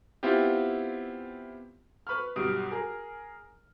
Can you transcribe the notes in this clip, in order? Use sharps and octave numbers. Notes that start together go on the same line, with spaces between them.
B3 C4 E4 F4 G4
B4 B5 C#6 F6
B1 G2 D#6 D7
G#4 A#4